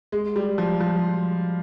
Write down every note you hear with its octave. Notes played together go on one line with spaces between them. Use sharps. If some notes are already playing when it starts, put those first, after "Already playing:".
G#3
G3
F3
F3